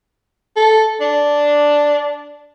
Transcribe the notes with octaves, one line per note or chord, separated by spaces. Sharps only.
A4
D4